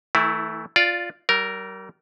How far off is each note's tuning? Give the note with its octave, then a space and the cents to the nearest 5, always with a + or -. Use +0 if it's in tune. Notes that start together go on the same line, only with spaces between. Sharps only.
E3 -40 A3 +0 E4 -5
F4 +0 D5 +0
G3 -40 A#4 +0